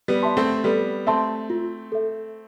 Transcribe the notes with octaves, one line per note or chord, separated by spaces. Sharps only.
G3 B3
E5 A5 C6
A3 C4
G3 B3 A4
A3 C4 E5 A5 C6
F4
A4 E5